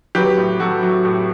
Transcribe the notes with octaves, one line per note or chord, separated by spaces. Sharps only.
F#3 G4 B4
A2
F#3 F#4 A4
F#3
A2 G4